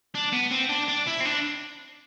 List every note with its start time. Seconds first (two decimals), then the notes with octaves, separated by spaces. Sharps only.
0.15 D4
0.32 B3
0.51 C4
0.69 D4
0.88 D4
1.07 E4
1.20 C4
1.25 D4